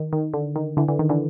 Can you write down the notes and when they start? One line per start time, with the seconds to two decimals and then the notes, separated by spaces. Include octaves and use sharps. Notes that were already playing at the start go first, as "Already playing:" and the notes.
Already playing: D#3
0.13 D#3
0.34 D3
0.56 D#3
0.77 D3 E3
0.88 D3 E3
0.99 D#3
1.09 D3 E3